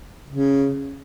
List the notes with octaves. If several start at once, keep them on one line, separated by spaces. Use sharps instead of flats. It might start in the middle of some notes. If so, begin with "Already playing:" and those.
C#3